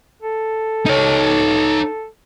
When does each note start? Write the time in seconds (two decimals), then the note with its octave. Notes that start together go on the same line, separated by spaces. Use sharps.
0.23 A4
0.86 D#4 C#5